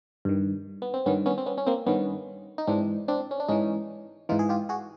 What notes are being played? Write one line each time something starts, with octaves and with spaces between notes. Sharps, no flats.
G2 D#3
B3
C4
G2 D#3 B3 C#4
B3 C#4
C4
B3 C#4
C#4
A#3 C4
G2 D#3 B3 C#4
D#4
G#2 E3 C4 D4
C4 D4
C#4
D4
G#2 E3 C#4 D#4
G#2 E3 D#4 F4
G#4
F4 G4
F#4 G#4